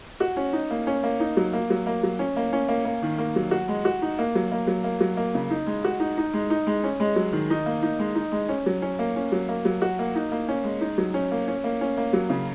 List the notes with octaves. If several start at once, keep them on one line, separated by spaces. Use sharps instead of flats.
F#4
C#4
D#4
A#3
C#4
A#3
D#4
F#3
A#3
F#3
A#3
F#3
C#4
A#3
C#4
A#3
A#3
D#3
A#3
F#3
F#4
G#3
F#4
D#4
A#3
F#3
A#3
F#3
A#3
F#3
A#3
C#3
D#4
G#3
F#4
D#4
D#4
G#3
D#4
G#3
C#4
G#3
F#3
D#3
D#4
A#3
D#4
G#3
D#4
G#3
C#4
F#3
C#4
A#3
C#4
F#3
A#3
F#3
F#4
A#3
D#4
A#3
C#4
G#3
D#4
F#3
C#4
A#3
C#4
A#3
C#4
A#3
F#3
C#3